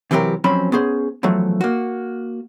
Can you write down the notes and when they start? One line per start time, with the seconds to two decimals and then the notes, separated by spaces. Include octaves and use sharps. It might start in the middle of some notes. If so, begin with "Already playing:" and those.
0.11 C3 E3 F#3 C4 G4 A#4
0.44 F2 F#3 C4 C#4 C5 B5
0.72 B3 C#4 G#4 C5
1.23 E2 F3 F#3 A3
1.61 A#3 F#4